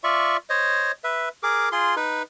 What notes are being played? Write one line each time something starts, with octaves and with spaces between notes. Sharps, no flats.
F4 D5 E5 C#6
C5 C#5 D#5
B4 E5
G#4 A#4 D6
F4 G#4 C6
D#4 B4